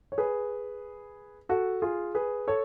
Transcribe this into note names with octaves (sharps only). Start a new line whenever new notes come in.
C#5
G#4 B4
F#4 A4
F4 G#4
G#4 B4
A4 C#5